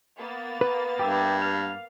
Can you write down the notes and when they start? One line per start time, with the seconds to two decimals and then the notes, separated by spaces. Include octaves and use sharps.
0.18 A#3 B3 A6
0.61 B4
0.99 G2 G4 E5
1.42 F5